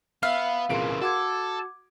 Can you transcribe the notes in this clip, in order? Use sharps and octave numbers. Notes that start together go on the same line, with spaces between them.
B3 E5 F5
C2 A#2 C#3 E3 G#4 A#4 C6 D7
F#4 A4 F#5 D6 G#6